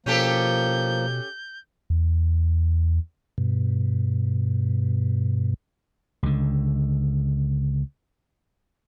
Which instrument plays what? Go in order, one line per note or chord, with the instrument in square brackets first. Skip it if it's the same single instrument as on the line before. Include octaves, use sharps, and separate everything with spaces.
[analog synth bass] B2 [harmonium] F3 A#3 [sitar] C#4 G4 A4 [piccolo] G6
[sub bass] E2
[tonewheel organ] G2 B2
[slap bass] C#2 D3